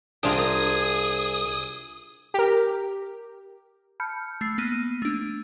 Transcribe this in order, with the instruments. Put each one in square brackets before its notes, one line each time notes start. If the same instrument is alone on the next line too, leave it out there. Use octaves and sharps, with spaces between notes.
[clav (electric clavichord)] C2 G5 [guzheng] D4 F4 A#4 [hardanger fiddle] G#4 [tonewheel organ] D#6
[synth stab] G4 A#4
[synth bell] A5 B5 F6 G6 C#7
A3 C7
A#3 B3 D#7
A3 D4